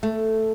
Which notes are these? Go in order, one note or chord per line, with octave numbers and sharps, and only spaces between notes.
A3